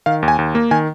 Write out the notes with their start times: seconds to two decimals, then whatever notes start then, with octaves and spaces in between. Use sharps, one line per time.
0.06 D#3 F5
0.22 D#2
0.28 G#5
0.39 D#2
0.55 A#3
0.71 D#3 G#5